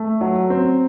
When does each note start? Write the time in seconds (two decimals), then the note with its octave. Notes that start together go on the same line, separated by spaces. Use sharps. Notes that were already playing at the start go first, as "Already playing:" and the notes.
Already playing: A3
0.21 F#3
0.50 C4